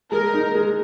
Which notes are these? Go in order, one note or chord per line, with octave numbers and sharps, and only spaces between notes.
G#3 A#4
D#4
G#3